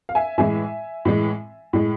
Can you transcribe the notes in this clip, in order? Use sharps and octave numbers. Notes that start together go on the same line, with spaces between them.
F5
E5 G#5
A2 E3 G#3 E5 G#5
A2 E3 G#3
A2 G#3